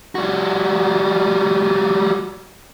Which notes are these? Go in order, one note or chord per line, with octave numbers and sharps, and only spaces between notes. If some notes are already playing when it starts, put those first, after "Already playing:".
G3 F#4